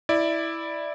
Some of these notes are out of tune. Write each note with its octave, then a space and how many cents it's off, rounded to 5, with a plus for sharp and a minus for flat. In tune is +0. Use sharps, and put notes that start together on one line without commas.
E4 -5 D5 +5